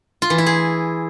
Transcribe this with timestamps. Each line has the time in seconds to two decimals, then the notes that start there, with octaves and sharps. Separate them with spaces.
0.22 F4
0.30 E3
0.38 E4
0.46 G#4